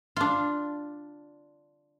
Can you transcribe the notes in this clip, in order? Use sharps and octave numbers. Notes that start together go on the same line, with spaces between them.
D4 F4